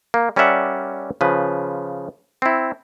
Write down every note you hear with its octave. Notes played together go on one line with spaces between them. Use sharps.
A#3
G3 C#4 A#4 D5 E5 F#5
C#3 F3 B4
C4 E4